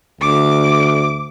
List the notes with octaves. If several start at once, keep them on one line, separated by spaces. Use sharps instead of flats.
D2 D6